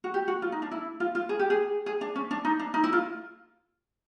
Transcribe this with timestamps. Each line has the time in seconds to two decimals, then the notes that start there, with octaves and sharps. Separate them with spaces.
0.04 F#4
0.14 G4
0.28 F#4
0.42 F4
0.52 D#4
0.62 D4
0.71 E4
1.00 F4
1.15 F4
1.29 G#4
1.39 G4
1.50 G#4
1.86 G#4
2.01 D4
2.16 C#4
2.31 D4
2.45 D#4
2.59 D4
2.74 D#4
2.84 E4
2.93 F4